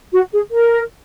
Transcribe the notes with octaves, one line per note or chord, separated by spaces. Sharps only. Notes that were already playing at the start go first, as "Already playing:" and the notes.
F#4
G#4
A#4